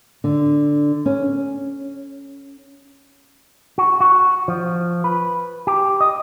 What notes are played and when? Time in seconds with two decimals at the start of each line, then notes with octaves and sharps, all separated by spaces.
0.24 D3
1.06 C#4
3.78 F#4
4.00 F#4
4.48 F3
5.04 B4
5.67 G4
6.01 D#5